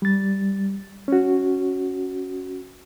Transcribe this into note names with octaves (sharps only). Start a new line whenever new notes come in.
G3 A6
C#4 F#4